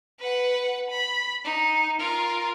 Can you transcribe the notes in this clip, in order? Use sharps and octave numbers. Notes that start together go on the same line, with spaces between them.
B4 F#5
B5
D#4
F4 A#4